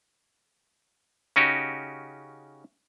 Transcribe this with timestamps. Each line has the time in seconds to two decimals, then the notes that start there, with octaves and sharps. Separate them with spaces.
1.36 C#3 C#4 D#4 F#4 G4